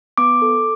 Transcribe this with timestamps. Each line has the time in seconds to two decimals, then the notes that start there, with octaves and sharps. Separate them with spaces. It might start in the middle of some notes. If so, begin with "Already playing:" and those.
0.18 B3 D6
0.42 A4